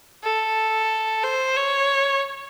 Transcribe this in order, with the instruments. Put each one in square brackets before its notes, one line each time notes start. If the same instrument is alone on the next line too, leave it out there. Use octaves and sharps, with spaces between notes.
[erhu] A4
C5
C#5